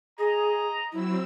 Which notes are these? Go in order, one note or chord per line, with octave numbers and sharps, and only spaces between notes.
G#4 D#5 A#5
F#3 C4 E4 E6